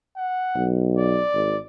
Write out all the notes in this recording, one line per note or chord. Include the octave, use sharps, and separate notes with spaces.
F#5
B1
D5
G#1